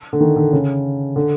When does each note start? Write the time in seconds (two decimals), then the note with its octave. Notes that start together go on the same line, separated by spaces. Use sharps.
0.13 D3
0.20 D#3
0.36 D3
0.53 C#3
1.16 D3